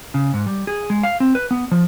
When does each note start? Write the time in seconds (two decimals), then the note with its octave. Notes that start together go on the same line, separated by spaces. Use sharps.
0.14 C#3
0.34 G#2
0.46 G3
0.67 G#4
0.90 G#3
1.03 F5
1.20 C4
1.35 B4
1.51 B3
1.71 F3